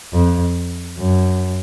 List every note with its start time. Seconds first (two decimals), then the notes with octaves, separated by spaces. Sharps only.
0.13 F2
0.98 F#2